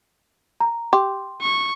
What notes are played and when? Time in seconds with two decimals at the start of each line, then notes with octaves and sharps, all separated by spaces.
0.60 A#5
0.93 G4 C6
1.41 C#6